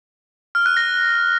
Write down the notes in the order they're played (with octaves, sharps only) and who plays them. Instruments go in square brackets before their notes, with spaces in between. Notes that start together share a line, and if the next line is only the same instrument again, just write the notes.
[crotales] F6
F#6
A#6